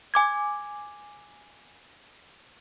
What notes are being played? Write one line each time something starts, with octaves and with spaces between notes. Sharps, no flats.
G#5 D6 G#6